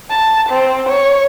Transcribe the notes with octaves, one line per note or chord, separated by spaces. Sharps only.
A5
C4
C#5